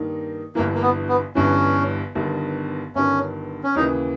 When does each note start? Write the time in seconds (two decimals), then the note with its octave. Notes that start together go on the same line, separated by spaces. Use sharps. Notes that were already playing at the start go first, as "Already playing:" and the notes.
Already playing: G2 D#3 A#3 D#4
0.55 G1 G2 E3 A#3
0.75 A#3
0.82 B3
1.09 B3
1.35 G1 G2 E3 C#4
2.15 G1 G2 D#3
2.95 G1 G2 D#3 C#4
3.63 C#4
3.75 D#2 C#3 E3 A#3 D#4